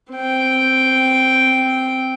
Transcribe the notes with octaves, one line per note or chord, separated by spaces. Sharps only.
C4 G5